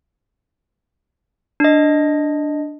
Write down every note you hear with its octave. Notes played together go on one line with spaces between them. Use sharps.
D4 D#5